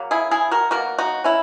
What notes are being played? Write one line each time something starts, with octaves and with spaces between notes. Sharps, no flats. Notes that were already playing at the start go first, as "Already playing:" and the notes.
Already playing: C#3 F#3 A#3
E4 G#4
E4 G#4
F#4 A#4
B2 F#3 A#3 F#4 A#4
D#4 F#4
C#4 E4